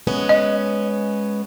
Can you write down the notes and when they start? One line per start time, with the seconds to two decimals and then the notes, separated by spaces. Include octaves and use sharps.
0.07 G#3 B3 C#4
0.29 D#5